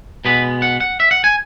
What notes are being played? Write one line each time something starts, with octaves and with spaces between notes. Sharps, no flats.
B2 G#3 B3 B4
F#5
F#5
E5
F#5
G#5